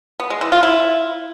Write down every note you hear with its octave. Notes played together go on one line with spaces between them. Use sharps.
B3
G#3
E3
F4
E4